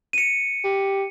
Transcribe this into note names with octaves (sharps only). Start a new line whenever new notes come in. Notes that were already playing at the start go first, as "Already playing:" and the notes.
C#7 D#7
G4